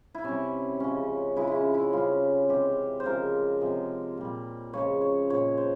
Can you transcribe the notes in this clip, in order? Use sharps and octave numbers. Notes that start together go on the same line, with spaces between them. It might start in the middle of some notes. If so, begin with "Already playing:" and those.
E4
C3 G3 C#4
C#3 F3 G#3 C#4
C#3 F3 G#3 E4
E4
C#4
E4
C#3 G3 F4
C3 E3 G#3 G4
C5
C#3 F3 G#3 A#4
C3 F3 G#3
A#2 G3
C#3 F3 G#3 C#5
C#5
A#2 G#3 C#5
C5